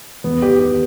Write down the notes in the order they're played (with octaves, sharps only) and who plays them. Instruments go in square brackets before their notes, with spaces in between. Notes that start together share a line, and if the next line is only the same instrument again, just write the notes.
[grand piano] E2 B3
G4
D#3
G4